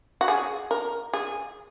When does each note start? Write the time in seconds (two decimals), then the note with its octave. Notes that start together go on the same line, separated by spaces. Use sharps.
0.21 F#4
0.28 G#4
0.71 A#4
1.13 G#4